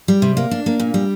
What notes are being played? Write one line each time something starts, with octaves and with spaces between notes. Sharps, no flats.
G3
C3
A#3
D4
A#3
A#2
G3